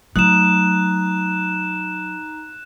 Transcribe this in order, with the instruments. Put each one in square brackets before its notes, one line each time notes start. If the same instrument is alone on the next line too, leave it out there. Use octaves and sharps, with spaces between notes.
[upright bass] F#3 A3 [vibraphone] D#4 A#5 [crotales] F#6 E7